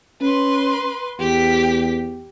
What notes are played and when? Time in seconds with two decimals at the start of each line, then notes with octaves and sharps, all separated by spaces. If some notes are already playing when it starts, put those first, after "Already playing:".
0.21 C#4 B4 C6
1.19 E2 G4 B6